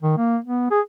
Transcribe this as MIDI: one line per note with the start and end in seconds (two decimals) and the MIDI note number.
0.03 0.15 51
0.17 0.37 58
0.45 0.70 59
0.71 0.81 68